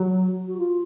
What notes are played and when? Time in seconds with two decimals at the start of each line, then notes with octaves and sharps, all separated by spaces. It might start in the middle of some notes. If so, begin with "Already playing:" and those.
Already playing: F#3
0.48 F#4
0.58 F4